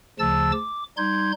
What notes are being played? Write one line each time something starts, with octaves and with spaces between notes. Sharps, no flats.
D2 C#3 F3 A5 E6 A6
D6
G3 D#4 C6 G6 G#6